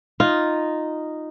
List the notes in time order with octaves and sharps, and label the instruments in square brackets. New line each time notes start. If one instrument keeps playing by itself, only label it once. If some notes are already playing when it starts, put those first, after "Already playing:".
[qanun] D#4 [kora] F4